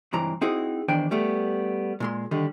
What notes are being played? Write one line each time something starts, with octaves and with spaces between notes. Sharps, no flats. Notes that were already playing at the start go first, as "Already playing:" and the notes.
C#2 G2 E3 C4 A#5
C4 D#4 E4 F#4 G#4
E2 D#3 D4 C5 G5
G3 A3 B3
A#2 G#3 C6
D3 D#3 G3